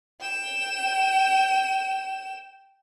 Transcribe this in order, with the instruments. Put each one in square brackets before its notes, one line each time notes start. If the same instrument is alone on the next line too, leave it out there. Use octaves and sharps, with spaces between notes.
[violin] G5 E7